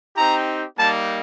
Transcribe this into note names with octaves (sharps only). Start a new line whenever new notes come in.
C4 D#4 G4 A#5
G3 A#3 D#4 A5